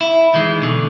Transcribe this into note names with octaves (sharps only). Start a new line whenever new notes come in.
E4
D#3 E3 G#3
B2 D3